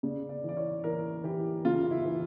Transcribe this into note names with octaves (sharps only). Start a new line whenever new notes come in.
C#3 D5
D5
E3
D5
C#5
E3 A#4
E3 G4
C#3 F4
E4
E3